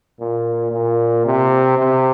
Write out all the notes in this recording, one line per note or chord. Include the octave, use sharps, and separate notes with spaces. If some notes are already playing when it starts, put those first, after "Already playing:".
A#2
A#2
C3
C3